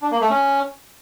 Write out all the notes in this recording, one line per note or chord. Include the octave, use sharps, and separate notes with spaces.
D4
A#3
A3
C#4